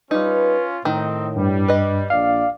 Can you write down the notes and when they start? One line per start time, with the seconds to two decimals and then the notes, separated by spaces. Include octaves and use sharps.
0.11 G3 C#4 D#4 F4 B4
0.85 A2 D#3 C4 D#4
1.36 G2 G3
1.68 B4 D#5
2.10 A#1 D5 F5